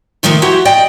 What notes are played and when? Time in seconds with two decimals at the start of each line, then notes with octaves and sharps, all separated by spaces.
0.23 C3 D#3 F3 A3 A#3
0.42 E4 F#4 G4 C5
0.65 D5 D#5 G5